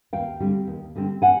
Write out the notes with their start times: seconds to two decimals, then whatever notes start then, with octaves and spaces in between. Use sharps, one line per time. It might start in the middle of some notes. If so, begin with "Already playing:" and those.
0.13 D#2 F5 G5
0.40 D3 G3 C4
0.68 D#2
0.96 D3 G3 C4
1.22 F#5 G#5